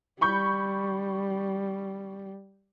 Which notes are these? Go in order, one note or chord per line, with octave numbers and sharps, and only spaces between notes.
G3 B5 C#6 G6